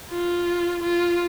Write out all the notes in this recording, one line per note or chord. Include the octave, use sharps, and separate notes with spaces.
F4
F4